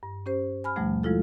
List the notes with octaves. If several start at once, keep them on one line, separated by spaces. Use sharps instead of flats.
G2
C#4 G4 C5
G#5 B5 F6
D#2 B2 F3 G3 A3
F3 G#3 E4 F4 A4